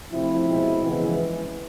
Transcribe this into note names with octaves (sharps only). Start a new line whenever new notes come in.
C3 F3 A3 C4 E4
B2 G#3 C4
F2 C#3 E3 G#3 B3